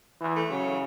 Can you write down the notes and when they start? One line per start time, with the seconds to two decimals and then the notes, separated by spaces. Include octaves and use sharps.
0.21 E3
0.36 A3
0.50 C#3 F#3